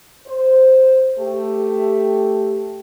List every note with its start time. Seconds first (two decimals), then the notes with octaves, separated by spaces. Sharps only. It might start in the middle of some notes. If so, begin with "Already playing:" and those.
0.27 C5
1.19 A3 G4